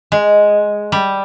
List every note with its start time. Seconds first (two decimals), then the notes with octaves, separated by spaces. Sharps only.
0.12 G#3
0.92 G3